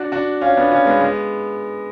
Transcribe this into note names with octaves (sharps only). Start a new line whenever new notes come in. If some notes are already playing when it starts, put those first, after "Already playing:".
Already playing: D4 F#4
D4 F#4
C#4 F4
B3 D4
C#4 F4
G#3 B3
G#3 B3